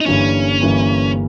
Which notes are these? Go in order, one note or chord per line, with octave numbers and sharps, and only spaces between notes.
D#4
G1 G2 E3 A#3 C#4
G1 G2 E3 A#3